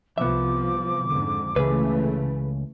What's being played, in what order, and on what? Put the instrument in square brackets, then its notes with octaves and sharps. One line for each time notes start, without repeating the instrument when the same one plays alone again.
[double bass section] C2 F3 [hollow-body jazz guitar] B3 E5 [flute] D6
[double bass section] F2 G#2 D3
[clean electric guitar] C#2 [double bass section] C#3 E3 A3 [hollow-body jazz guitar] G#4 B4